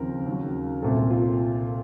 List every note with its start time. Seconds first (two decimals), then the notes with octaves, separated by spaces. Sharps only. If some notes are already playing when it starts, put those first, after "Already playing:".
Already playing: D#2 C#3 F3 C4 A#4
0.26 D#2 C#3 F#3
0.82 C2 A#2 A3 C4 A4
1.11 F4